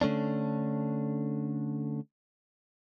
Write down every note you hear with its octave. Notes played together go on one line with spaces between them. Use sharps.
D3 A3 C#4 D4